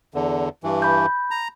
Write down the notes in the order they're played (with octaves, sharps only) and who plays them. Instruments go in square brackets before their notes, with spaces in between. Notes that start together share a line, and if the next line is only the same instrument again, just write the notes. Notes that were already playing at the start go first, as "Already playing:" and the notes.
[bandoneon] E2 D3
G2 E3
[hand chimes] B5 G6
[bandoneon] A#5